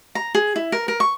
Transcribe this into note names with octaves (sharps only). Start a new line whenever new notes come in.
A#5
G#4
E4
A#4
A#4
C#6